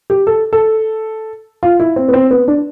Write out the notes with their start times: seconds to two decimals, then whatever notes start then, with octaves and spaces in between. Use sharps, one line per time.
0.10 G4
0.27 A4
0.53 A4
1.63 F4
1.80 E4
1.96 C4
2.08 B3
2.13 C4
2.31 B3
2.48 D4